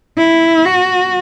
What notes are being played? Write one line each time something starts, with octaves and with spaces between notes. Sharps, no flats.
E4
F#4